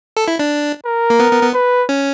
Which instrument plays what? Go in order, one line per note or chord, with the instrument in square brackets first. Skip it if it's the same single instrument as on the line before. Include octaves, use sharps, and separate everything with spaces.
[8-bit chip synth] A4
E4
D4
[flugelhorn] A#4
[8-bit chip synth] A#3
B3
B3
B3
[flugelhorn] B4
[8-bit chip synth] C#4